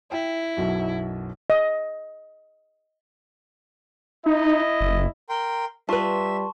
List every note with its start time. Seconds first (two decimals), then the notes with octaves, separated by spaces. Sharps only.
0.12 E4 G5
0.57 B1 F#2 B2
1.50 D#5
4.26 D#4 E4 D#5
4.80 F#1
5.29 A#4 G5 C6
5.89 G3 F4 B4 E5 A5 C6 C#6